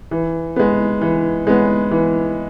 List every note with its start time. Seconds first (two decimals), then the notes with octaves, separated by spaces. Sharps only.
0.11 E3
0.56 G#3 B3
1.01 E3
1.47 G#3 B3
1.91 E3